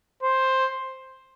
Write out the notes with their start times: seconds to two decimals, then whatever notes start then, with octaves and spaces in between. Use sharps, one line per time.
0.23 C5